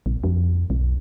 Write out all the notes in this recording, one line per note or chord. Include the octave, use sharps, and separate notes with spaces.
A#1
F2
B1